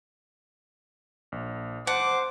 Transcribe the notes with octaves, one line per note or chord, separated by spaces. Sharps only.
A#1
C5 F#5 A5 D6